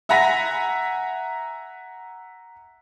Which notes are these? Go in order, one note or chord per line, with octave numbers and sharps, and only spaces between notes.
E5 F#5 G#5 A#5 A#6 B6